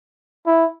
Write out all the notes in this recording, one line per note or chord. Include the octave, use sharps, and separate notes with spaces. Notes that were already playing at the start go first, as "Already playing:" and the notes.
E4